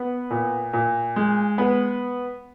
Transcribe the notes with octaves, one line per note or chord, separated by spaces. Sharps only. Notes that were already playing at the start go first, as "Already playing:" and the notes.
Already playing: B3
A#2
A#2
G#3
B3